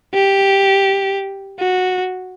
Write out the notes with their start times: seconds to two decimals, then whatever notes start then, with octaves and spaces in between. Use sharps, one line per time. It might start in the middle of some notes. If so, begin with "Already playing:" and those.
0.14 G4
1.59 F#4